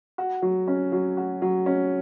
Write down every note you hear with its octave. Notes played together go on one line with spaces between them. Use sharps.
F#4
F#3
C#4
F#3
F#4
F#3
C#4